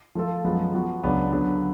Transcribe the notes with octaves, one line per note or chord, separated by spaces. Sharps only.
F3 A3 F4 A4
F#2 F3 G#3 B3
F3 B3 F#4
C#2 C#3 F#3 B3 D4
D3 F#3 B3